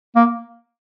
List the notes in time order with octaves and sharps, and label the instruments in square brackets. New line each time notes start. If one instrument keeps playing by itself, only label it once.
[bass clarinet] A#3